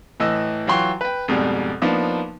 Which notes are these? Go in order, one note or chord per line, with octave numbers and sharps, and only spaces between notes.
A2 E3 D#5 E6
E3 F#3 F4 G5 C6 C#6
B4 G5
F2 G#2 B2 G3 D5
F3 A#3 B3 D4 D#4